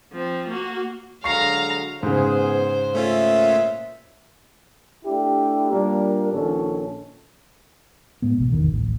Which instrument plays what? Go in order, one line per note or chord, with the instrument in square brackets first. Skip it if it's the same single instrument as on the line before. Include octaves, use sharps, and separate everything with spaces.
[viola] F3 C4
A#3 F#4
[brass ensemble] D3 F#3 G#3 [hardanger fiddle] F5 A#5 [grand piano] C#6 C7
[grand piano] G#2 C#3 [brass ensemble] B3 G#4 [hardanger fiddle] C5
[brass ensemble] A#2 E5 [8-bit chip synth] A3 C#4 F4
[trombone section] A3 D4 E4 G4
A#2 G3 A#3 D4 A#4
A#1 A#2 D#3 C#4 A4
[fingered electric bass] A2 G#3 B3
A1 B2
G#1 E2 D#3
D1 A1